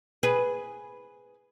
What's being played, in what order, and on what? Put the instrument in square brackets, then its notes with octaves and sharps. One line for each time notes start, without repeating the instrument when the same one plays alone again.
[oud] G#4 B4